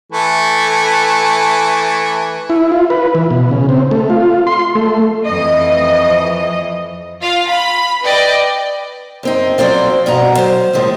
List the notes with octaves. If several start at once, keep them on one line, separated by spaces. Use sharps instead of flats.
E3 A3
E4
F4
B4
E3
B2
C#3
C4
A3
F4
C6
A3
F2 E3 D#5
F4 F5
B5
B4 D5 D#5 G5
F#2 C4 D#4
F3 F#3 C4 C5 D5
G2 B2 F#5 A#5
F#3 C5
D#2 A2 F3 G#3